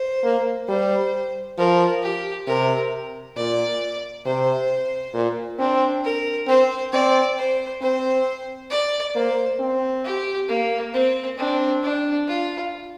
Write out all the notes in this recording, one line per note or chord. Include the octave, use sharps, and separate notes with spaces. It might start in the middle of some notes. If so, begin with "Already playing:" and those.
Already playing: C5
A#3
G3 C5
F3 A#4
G4
C3 A#4
A#2 D5
C3 C5
A#2
C4 D4
A#4
C4 C5
C4 D5
C5
C4 C5
D5
A#3 C5
C4
G4
A#3
C4
C4 D4
D4
F4